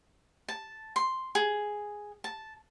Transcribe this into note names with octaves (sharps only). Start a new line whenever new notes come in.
A5
C6
G#4
A5